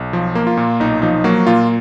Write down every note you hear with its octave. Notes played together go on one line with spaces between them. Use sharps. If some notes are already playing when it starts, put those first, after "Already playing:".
Already playing: B1
F3
A#3
F4
A#2
B1 D#4
F3 D#4
F#3 A#3 F#4
A#2 F4